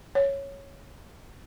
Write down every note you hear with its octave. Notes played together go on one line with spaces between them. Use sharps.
C#5